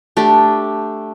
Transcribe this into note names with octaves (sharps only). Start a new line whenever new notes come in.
A3 D4 G4